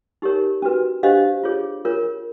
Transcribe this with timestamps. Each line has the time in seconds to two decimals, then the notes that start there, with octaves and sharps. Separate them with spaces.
0.22 D#4 G4 A#4 C#5
0.62 C#4 F#4 B4
1.03 D4 G4 C5 D#5 F5
1.43 F4 G#4 C#5
1.85 F4 A#4 C#5